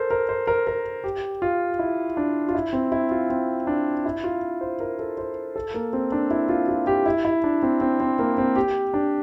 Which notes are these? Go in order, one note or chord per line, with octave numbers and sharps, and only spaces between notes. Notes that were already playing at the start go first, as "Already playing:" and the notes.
Already playing: A4 A#4 C5
A#4
C5
A#4
A#4
G4
F4
E4
D4
F4
E4
C4
E4
F4
C4
D4
E4
F4
C5
A#4
A4
C5
A4
A#3
C4
D4
E4
F4
F4
G4
E4
E4
D4
C4
C4
C4
A#3
C4
G4
D4